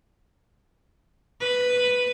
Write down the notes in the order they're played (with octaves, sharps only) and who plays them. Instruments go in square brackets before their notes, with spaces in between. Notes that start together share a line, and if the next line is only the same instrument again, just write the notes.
[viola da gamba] B4